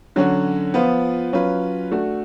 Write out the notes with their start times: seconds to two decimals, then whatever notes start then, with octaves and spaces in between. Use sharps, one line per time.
0.16 D3 F#3 C#4 F#4
0.74 F3 B3 F4 B4
1.33 F#3 C#4 F4 B4
1.91 A3 D4 F#4